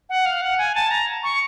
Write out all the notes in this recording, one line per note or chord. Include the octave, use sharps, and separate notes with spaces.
F#5
F5
F#5
G#5
A5
A#5
C#6